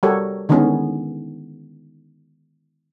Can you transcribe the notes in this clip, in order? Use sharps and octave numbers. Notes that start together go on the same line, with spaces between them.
G3 F#4 G4 A4 A#4 C#5
D3 D#3 G#3 B3 C#4 E4